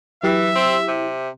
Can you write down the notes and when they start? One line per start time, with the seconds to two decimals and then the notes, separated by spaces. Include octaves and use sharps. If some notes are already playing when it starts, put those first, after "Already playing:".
0.23 E3 F#3 E4 G4 E5
0.56 C4
0.88 C3